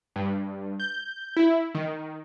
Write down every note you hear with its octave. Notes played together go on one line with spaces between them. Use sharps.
G2
G6
E4
D#3